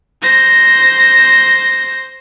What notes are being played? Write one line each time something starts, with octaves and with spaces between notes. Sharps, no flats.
C5 A#6